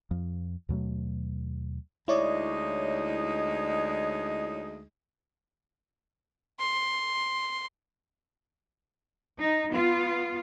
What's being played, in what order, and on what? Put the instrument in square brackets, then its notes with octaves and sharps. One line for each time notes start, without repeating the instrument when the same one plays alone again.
[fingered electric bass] F2 F3
D#2 B2 F#3 A3
[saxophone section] D2 G#3 D#4 [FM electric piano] E4 C#5 D5
[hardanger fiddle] C6
[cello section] D#4
B3 F4